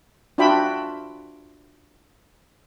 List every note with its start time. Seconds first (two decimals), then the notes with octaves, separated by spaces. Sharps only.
0.38 D4 F4 F#4 E5 G5 B5